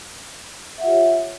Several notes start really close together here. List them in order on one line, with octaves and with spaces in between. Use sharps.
E5 F#5 F4 G4 C#5